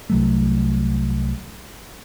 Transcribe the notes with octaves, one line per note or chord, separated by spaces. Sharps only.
C2 F#3 A3